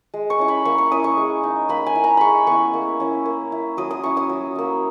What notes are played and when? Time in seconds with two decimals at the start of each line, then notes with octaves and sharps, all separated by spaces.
0.14 G#3
0.30 C#6
0.39 C#4 E4
0.48 B5
0.65 A#3 C#6
0.78 C#6
0.91 C#4 E4 D#6
1.04 C#6
1.17 G#3
1.43 D#4
1.69 A#3 B5
1.86 G#5
1.95 E4
2.04 A#5
2.17 G#3 B5 C#6
2.47 B3 E4 C#6
2.74 A#3
3.00 C#4 E4
3.26 A#3
3.52 E4
3.77 F#3 D#6
3.91 D#6
4.03 C#4 E4 C#6
4.17 D#6
4.29 F#3
4.55 A#3 E4